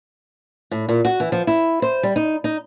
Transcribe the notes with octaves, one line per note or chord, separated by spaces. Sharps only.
A2
A#2
F#4
E3
F3
E4
C5
G3
D#4
D#4